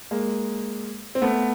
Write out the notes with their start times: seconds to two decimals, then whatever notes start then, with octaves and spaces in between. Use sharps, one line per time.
0.11 G#3 A#3
1.15 C4
1.22 A3 B3